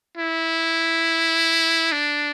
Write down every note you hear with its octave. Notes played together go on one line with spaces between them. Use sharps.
E4
D4